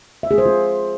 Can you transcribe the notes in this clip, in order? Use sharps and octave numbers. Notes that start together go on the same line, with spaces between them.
E5
G#4
C5
F4